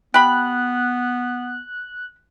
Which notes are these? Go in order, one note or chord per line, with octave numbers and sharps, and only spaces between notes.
B3 G4 B5 F#6